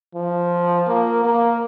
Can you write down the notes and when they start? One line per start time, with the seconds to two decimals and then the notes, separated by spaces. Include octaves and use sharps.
0.15 F3
0.88 A#3
1.25 A#3